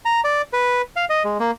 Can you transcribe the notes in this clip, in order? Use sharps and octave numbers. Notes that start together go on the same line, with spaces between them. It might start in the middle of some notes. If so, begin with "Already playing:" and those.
A#5
D5
B4
F5
D#5
G#3
A#3